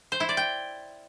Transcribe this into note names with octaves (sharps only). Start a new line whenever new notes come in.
C5
E4
D5
G5